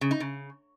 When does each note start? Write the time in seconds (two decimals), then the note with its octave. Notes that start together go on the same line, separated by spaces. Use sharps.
0.01 C#3
0.11 D#4
0.20 C#3